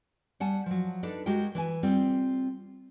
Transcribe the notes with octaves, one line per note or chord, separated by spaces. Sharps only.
G3 F#5 G#5 A5
F3 F#3
D4 D#4 A4 B4
G#3 F#4 G4 A#4 G5
E3 B4 G#5
G3 C4 F4